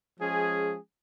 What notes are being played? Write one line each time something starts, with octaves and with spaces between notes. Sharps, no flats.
F3 G#3 C#4 G#4